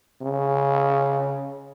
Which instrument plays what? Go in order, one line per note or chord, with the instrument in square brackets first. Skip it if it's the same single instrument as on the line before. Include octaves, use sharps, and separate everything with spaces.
[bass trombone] C#3